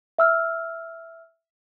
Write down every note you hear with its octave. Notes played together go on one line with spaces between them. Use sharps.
E5 E6 F6